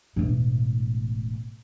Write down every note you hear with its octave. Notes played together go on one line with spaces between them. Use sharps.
E1 A2